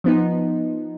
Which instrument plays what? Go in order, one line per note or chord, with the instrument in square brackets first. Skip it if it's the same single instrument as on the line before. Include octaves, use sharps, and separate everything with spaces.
[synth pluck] F3 B3 D#4